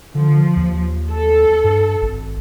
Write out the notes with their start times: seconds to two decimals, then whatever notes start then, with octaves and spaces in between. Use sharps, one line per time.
0.15 D3 F3
0.56 D#2
1.09 A4
1.64 G2
2.02 G#1